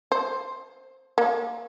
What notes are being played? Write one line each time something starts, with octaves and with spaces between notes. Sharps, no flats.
C5
A#3